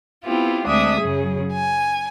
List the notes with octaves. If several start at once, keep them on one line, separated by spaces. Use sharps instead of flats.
B3 C4 E4 F4 G4
D2 G#3 C4 D4 E5 D#6
F#2 C#3 F#3 G#4
G#5